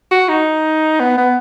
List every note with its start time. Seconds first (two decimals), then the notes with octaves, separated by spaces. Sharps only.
0.11 F#4
0.29 D#4
1.00 B3
1.18 B3